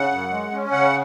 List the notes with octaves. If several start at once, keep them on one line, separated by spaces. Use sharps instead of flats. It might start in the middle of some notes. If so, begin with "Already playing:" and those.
Already playing: C#3 F#5
F#2
G#3
C#4
C#3 F#5